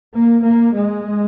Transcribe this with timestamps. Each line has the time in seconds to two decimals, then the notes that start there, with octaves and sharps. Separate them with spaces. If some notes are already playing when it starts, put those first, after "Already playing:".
0.13 A#3
0.43 A#3
0.73 G#3